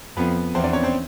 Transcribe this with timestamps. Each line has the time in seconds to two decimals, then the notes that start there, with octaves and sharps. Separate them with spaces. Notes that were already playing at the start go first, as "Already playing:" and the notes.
0.17 F2 B3 B4
0.55 E2 C4 C5
0.64 D4 D5
0.73 C#4 C#5
0.83 C4 C5